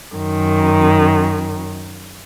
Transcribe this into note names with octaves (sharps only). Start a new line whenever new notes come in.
F#2 D#3